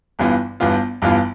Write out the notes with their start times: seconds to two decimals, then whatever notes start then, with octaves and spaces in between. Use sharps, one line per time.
0.19 G1 G2 E3 B3 F4
0.60 G1 G2 E3 B3 F4
1.02 G1 G2 E3 B3 F4